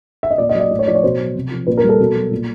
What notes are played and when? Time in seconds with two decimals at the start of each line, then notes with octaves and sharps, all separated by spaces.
0.23 E5
0.31 D#5
0.38 A#2 D5
0.49 D#5
0.54 F#3 D5
0.60 D#5
0.70 A2 D5
0.79 C#5
0.87 F3 D5
0.95 C#5
1.03 B2 C5
1.19 F#3
1.35 C3
1.51 F3
1.67 A#2 B4
1.78 A#4
1.84 G3
1.89 A4
2.00 B2
2.16 F#3
2.31 A#2